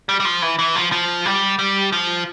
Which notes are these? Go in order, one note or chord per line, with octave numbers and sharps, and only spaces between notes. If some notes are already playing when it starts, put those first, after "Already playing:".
G3
G3
F3
E3
E3
F3
F3
G3
G3
F3